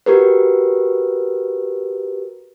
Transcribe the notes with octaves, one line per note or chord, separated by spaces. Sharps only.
F#4 G4 A#4 B4